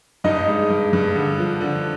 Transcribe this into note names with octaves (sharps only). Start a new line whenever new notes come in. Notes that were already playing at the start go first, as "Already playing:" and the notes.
G2 D#4 D#5
G#3
G2
G2
D3
F3
D3